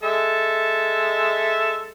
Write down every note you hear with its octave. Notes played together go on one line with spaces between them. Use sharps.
G#3 A4 E5